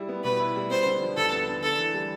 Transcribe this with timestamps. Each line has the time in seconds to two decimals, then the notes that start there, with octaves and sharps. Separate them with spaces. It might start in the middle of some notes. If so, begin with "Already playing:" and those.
Already playing: G3 E4
0.09 B3
0.24 B2 B4
0.40 E4
0.55 G3
0.70 B3 C5
0.86 D3
1.02 F3
1.17 D2 A4
1.32 B3
1.48 D3
1.63 D4 A4
1.78 E3
1.94 G3